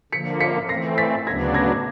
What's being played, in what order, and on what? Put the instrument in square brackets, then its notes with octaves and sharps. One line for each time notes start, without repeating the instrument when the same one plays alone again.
[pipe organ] D3 F3 A#3 [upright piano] B6 C#7
[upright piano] B6 C#7
[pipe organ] E3 A3 C4 [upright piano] A#6 C7
[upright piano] A6 B6
[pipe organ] D2 C#3 F#3 B3 D4 [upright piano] G#6 A#6
[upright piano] G#6 A#6